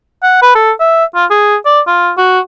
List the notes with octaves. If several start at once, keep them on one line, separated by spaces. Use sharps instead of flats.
F#5
B4
A4
E5
F4
G#4
D5
F4
F#4